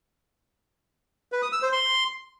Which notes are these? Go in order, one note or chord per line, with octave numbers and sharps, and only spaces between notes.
B4
D#6
E6
C5
C6